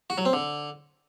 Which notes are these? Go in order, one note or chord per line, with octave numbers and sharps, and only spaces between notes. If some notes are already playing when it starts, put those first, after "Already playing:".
F#4
F#3
C4
D3